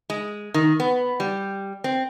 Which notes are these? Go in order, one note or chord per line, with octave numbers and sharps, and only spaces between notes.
G#3
D#3
B3
G3
C4